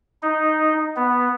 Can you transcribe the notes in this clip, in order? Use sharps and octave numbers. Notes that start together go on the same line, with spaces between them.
D#4
B3